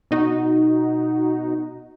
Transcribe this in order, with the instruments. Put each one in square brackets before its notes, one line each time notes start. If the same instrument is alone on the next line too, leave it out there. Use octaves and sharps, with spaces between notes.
[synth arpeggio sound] B2 D#4 F#4